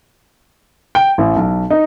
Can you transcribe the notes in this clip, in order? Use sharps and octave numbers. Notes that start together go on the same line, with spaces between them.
G5
A1
B1
D#4